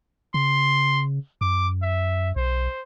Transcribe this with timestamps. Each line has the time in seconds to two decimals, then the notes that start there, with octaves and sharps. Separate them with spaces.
0.34 C#3 C6
1.41 F#2 D6
1.82 E5
2.36 B1 C5